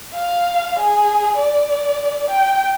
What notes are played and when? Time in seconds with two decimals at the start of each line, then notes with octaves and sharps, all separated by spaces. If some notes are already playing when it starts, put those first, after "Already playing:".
0.14 F5
0.79 G#4
1.36 D5
2.30 G5